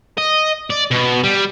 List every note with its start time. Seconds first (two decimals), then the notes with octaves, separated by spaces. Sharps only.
0.18 D#5
0.70 D5
0.91 B2
1.23 G3